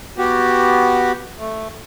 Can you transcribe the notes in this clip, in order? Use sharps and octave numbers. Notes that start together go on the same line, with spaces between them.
B3 F#4 G4
A3